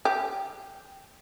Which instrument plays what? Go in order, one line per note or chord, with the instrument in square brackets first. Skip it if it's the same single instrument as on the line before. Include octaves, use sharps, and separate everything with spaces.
[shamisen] G4